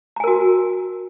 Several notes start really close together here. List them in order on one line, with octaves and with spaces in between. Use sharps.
A#5 G#5 A#4 F#4